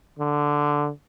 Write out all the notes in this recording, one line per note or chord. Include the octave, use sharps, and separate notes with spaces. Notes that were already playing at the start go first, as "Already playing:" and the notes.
D3